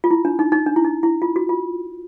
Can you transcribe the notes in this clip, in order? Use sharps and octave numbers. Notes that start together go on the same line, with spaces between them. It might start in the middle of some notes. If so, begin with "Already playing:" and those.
F4
E4
D4
D#4
D#4
D4
E4
D#4
E4
F4
F#4
F4